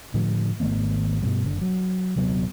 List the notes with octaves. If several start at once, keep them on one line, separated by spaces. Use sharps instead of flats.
A2 D3 F3
G#1 D#3 A3 B3
G2 B2 G3
F#1 D3
F#3
D#1 C3 F#3 B3